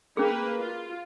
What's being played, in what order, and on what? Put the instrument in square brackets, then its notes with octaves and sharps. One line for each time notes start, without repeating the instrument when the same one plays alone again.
[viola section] A#3 B4 [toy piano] C#4 G#4
[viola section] F4